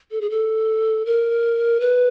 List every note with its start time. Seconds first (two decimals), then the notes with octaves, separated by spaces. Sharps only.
0.11 A4
0.21 G#4
0.30 A4
1.06 A#4
1.80 B4